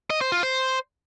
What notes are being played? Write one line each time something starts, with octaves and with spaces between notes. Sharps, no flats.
D#5
C5
F4
C5